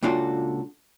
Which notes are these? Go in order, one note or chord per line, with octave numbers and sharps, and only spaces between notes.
C#2 A#2 D4 F4 F#4 A4